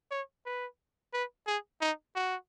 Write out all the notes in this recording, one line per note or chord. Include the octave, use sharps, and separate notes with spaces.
C#5
B4
B4
G#4
D#4
F#4